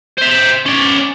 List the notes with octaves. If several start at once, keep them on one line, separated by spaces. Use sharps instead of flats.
C5 E5
C#4 D5